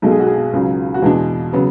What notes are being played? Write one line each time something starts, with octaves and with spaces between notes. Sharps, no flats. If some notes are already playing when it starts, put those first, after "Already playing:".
B1 B2 G#3 A4
G#4
F#4
G#4
C#2 C#3 F#3
F#4
E2 B2 G#3 D4 G#4
C#3 F#3 B3